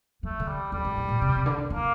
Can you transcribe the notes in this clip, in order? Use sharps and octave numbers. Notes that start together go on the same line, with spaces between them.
F3 A3
D3
G3
F2 G3
G2
A2
A#2
C3
C3
D3
E3 A#3